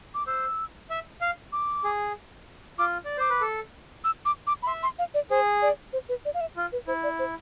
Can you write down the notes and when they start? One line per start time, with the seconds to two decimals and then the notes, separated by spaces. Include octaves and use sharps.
0.14 D6
0.27 C5 E6
0.90 E5
1.21 F5
1.52 D6
1.84 G#4
2.78 F4 D6
3.05 D5
3.17 C5 D6
3.30 B4
3.41 A4
4.04 E6
4.25 D6
4.47 D6
4.63 B5
4.67 E5 C6
4.83 C6
4.99 F5
5.14 D5
5.30 G#4 C5
5.62 D5
5.93 C5
6.09 B4
6.25 D5
6.34 F5
6.41 E5
6.57 F4
6.72 B4
6.87 E4 C5
7.03 D5
7.19 C5